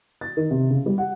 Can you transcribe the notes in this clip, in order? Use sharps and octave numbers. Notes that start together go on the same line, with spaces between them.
A6
D#3
C3
C#3
G3
F#5